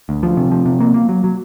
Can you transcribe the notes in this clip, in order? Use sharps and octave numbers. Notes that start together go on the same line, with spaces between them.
D2
F3
C3
F3
C3
A#3
A#3
F#3
F#3